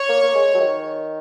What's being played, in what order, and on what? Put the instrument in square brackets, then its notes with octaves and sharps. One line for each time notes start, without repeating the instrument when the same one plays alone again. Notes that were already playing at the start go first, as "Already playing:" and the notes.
Already playing: [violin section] C#5
[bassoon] A#3
A#3
G#3
F#3
D#3